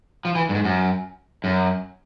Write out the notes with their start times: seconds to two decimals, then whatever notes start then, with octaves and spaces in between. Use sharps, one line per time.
0.25 F3
0.35 E3
0.49 G2
0.54 G#2
0.64 F#2
1.44 F#2